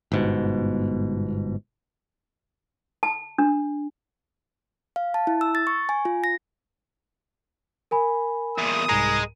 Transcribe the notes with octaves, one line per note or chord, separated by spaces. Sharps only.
G1 G#2 B2
A5
D4
F5
A5
E4
E6
A6
C#6
G#5
F4
A#6
A#4 G#5 B5
E2 A#2 D#6
C2 G#2 G#3 A#5